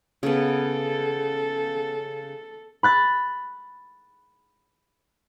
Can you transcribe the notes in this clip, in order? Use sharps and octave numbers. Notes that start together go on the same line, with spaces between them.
C#3 B3 A4
B5 F#6 A6